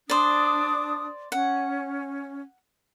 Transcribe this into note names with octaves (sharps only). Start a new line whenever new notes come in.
D4 C5 D5 D#6
C#4 F#5